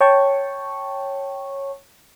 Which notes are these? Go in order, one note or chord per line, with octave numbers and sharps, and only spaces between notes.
C#5 G5 A5 C#6